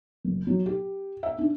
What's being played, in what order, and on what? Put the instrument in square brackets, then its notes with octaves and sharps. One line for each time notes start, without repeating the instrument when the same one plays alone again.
[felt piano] F#1
F#3
G4
E5
D4